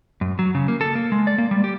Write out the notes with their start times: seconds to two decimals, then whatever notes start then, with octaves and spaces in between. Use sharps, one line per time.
0.21 F#2
0.39 F#3
0.55 C#3
0.68 A#3
0.81 A4
0.95 A#3
1.12 G#3
1.27 D5
1.38 A#3
1.51 G3
1.64 G4